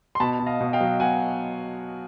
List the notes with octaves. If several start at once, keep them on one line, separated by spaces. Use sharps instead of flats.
C6
B2 A5 B5
B2
D#5 F5
B2
F5 G5
F#3
B2 F#5 G#5